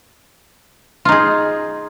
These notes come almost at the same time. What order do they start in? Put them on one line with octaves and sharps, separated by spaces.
F4 D#4 G#4